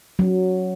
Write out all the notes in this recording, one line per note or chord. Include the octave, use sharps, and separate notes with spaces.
F#3